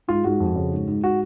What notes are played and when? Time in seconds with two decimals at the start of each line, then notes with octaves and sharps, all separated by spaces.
0.08 G#2 F4
0.24 G#2 F#4
0.40 F2
0.56 C#3
0.72 G#2
0.87 G#2
1.04 F#4